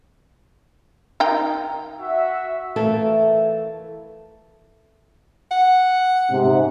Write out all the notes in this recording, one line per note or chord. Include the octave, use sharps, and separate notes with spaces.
D#3 D#4 G5
F#4 E5
E3 A3 F4 A4 A#4 C#5
F#5
G#2 C3